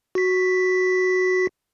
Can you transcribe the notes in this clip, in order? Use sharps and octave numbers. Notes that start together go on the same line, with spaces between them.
F#4 B6